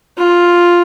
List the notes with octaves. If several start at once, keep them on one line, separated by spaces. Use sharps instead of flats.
F4